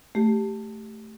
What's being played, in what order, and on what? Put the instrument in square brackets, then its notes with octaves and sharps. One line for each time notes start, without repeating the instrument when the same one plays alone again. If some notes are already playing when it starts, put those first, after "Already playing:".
[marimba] A3 G4